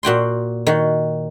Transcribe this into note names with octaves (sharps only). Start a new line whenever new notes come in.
A#2 F#4 G5 C6
D#3 F#4